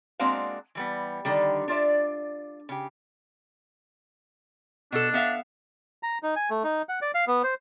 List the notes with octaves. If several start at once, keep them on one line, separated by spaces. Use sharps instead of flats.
G#3 A#3 C4 D4 F#4 F5
E3 G3 B3
D3 D#3 G3
D4 F4 D5 E5
C#3 G4
B2 D4 A4
B3 E5 F5
A#5
D#4
G#5
A3
D#4
F#5
D5
F5
B3
C5